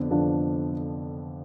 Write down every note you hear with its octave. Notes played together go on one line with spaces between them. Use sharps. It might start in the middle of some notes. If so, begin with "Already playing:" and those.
Already playing: F2 D3 B3 D4
F2 D3 F3 B3 D4